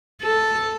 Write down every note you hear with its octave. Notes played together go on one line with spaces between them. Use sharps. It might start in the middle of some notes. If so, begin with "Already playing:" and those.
A4